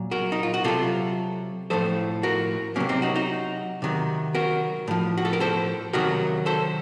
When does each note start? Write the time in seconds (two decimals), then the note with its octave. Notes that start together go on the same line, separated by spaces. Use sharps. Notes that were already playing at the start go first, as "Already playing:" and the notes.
Already playing: A#2 F#3
0.11 F#4 A#4
0.32 D#4
0.43 F4
0.54 F#4
0.64 C3 F#3 F4 A4
1.70 A2 F3 A4 C5
2.23 F#4 A#4
2.76 C3 F#3 A#3 C#4
2.89 C4 D#4
3.02 D#4 F#4
3.16 D#4 F#4
3.82 C3 D#3 F#3
4.35 F#4 A#4
4.88 A2 F3
5.18 F#4
5.25 A4
5.33 A#4
5.40 A4 C5
5.93 C3 D#3 F#3 F#4 A#4
6.46 A4 C5